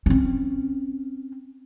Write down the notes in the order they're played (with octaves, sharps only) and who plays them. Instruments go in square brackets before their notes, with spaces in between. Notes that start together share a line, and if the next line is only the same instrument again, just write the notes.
[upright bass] C4 C#4